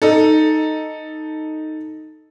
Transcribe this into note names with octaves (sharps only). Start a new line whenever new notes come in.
D#4 A4